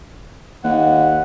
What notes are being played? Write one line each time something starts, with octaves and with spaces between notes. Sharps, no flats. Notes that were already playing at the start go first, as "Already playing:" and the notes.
D#2 F#5